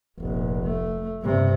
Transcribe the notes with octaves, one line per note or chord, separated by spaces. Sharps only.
F1 A#1
A3
G2 C3